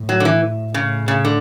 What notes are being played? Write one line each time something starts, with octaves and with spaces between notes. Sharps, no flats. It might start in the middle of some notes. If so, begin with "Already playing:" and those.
Already playing: A2
F#3
D3
E3
A2 C#3
C#3
D3